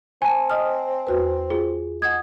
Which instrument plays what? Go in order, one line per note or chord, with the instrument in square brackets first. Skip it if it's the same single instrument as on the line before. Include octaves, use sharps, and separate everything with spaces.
[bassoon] C4 [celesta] G#5 A5
[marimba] D#5 D#6 F6
E2 F#4 B4
[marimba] F4 [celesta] G#4
[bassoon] G#3 [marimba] F#5 D#6 [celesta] G#6